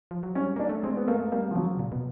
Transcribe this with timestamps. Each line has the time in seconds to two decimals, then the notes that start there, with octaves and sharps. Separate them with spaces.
0.11 F3
0.23 F#3
0.35 G3 C#4
0.56 A#3 D4
0.69 A3
0.83 G#3 C4
0.96 B3
1.08 A3 A#3
1.20 A#3
1.32 G3 A#3
1.51 F3
1.55 C#3 F#3
1.79 A#2
1.92 B2